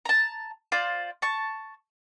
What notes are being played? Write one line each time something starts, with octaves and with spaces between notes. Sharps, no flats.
A5 A#5
F4 C5 D5
A5 C#6